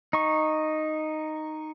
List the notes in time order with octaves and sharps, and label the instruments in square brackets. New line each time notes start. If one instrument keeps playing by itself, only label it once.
[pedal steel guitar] D#4 C#6